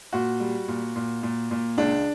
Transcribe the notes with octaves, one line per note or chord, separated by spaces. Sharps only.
A#2 F#4
G3
A#2
A#2
A#2
A#2
C#2 D4